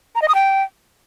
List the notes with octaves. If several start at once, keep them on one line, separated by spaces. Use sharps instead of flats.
A#5
D#5
D#6
G5